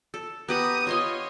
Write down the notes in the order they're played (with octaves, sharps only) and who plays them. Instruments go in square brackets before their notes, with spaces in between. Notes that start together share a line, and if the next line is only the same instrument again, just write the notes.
[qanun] A4
[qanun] B3 G4 F#5 [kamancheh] A#5 D#6
[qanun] F4 D#5 C6 [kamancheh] C#5